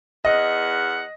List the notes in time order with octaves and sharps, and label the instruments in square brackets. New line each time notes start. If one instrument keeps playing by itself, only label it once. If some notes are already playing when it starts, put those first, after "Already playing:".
[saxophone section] E2 F#5 [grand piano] D#5